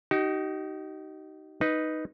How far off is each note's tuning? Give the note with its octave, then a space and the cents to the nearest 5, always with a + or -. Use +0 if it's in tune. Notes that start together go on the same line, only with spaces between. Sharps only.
D#4 +0 G4 -45
D#4 +0 B4 -5